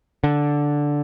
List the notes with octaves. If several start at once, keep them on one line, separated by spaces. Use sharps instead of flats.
D3